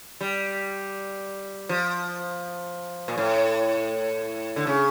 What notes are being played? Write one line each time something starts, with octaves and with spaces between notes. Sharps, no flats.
G3
F3
A#2
A2
D3
C#3